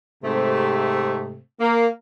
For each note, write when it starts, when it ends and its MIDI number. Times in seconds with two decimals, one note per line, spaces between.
0.24 1.39 44
0.24 1.39 48
0.24 1.39 57
1.60 1.87 58